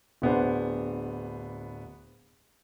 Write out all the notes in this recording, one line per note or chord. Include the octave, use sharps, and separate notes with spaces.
D1 B3 D4 C5